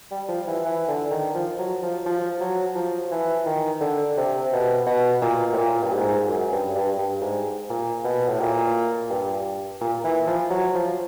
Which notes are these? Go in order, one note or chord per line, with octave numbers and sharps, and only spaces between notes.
G3
F3
E3
E3
D3
D#3
F3
F#3
F3
F3
F#3
F3
E3
D#3
D3
C3
B2
B2
A#2
A2
A#2
G2
G#2
F#2
G2
G2
G2
G#2
A#2
B2
A2
A#2
G2
A#2
E3
F3
F#3
F3